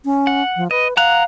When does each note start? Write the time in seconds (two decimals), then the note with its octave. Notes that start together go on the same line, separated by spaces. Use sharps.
0.05 C#4
0.27 F#5
0.57 F3
0.71 B4 D#5
0.97 F5 F#5 A#5 F#6